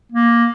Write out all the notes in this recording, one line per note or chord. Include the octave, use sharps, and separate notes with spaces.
A#3